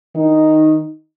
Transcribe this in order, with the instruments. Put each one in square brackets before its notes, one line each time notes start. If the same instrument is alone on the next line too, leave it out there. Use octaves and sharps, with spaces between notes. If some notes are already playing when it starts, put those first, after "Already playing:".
[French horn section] D#3 D#4